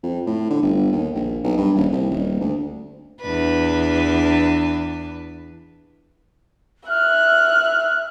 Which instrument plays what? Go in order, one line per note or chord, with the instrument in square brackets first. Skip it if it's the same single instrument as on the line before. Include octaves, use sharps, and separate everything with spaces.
[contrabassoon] F2
A2
D3
G1
D#2
A#1
B1
G2
D#1
C2
D#1
D2
[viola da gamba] E2 D4 B4
[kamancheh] E5 F#6 [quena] F6